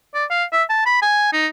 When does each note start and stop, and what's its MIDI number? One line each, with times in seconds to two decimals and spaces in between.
0.14 0.25 74
0.31 0.44 77
0.53 0.63 76
0.70 0.85 81
0.86 0.99 83
1.02 1.28 80
1.33 1.47 63